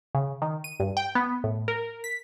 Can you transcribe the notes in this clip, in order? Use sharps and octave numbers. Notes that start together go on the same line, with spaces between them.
C#3
D#3
D#7
G2
G5
B3
A2
A#4
B6